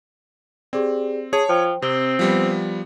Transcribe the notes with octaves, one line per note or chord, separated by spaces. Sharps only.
C4 G4 G#4 D5
G#4 C#5 A5
F3 C5 G5
C3 C4 D#6 G7
F3 G3 B3